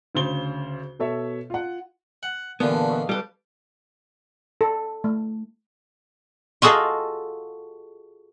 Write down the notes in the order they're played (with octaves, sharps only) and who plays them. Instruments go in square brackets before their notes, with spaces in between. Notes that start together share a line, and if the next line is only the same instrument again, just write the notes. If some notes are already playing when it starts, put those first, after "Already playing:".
[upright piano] D2 C#3 C5 G7
B2 A4 C#5 E5
F4 F#5
[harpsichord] F#5
[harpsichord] A#2 D3 E3 [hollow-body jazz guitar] B3 [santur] G4 F5 A5
[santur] A3 B4 D#5
[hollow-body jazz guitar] G3 G4 [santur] A4 B4
[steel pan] A4
A3
[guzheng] F4 F#4 G#4 A4 D#5 F5